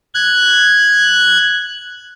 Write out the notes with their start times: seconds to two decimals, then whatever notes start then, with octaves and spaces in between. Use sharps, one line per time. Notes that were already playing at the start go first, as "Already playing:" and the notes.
0.15 F#6 G#6